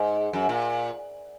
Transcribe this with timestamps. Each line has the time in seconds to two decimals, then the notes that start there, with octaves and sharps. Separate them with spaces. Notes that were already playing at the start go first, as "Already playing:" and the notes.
Already playing: G#2
0.33 F#2
0.49 A#2